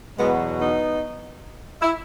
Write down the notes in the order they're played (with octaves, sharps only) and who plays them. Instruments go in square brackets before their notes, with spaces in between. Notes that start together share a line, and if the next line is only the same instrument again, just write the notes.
[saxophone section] E2 B2 F#3 G#3 B3
B3 D#4
E4